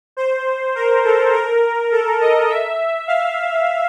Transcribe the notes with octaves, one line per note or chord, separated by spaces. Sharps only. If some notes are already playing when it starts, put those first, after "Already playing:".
C5
A#4
A4
A#4
A4
D#5
E5
F5